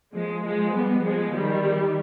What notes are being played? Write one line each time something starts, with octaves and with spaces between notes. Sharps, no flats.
F3 G#3
F3 G#3
G3 B3
F3 G#3
D#3 G3